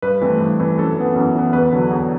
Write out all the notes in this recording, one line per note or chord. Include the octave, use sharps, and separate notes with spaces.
G2 B4
E3 A3 C4
G2
E3 A3 C4
F#2 A4
E3 B3
F#2
E3 B3
E2 B4
D3 F#3
E2